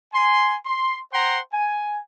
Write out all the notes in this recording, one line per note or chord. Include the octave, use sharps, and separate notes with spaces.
G#5 C6
C6
C5 F#5 G5 A#5 C6
G#5